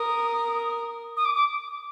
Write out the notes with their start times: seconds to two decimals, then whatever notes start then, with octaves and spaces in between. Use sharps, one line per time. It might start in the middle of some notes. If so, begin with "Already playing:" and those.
Already playing: A#4 D#6
1.17 D#6
1.25 D6
1.35 D6